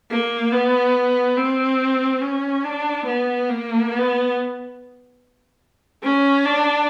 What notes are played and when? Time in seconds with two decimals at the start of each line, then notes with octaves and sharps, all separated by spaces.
0.10 A#3
0.53 B3
1.37 C4
2.21 C#4
2.65 D4
3.06 B3
3.49 A#3
3.92 B3
6.03 C#4
6.45 D4